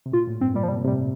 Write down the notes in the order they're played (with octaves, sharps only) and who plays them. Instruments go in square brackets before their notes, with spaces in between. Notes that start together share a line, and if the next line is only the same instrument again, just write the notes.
[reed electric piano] C3
[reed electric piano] A#2 [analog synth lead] F4
[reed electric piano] A2
[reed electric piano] G2 [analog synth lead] C4
[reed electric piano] A#2 [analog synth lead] G3
[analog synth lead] F3
[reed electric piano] C3 [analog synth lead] G3
[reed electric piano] A#2
[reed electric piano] A2 C3 [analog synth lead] G3